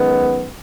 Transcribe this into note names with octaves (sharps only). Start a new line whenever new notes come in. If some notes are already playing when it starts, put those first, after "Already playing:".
Already playing: F#2 D#3 G#3 B3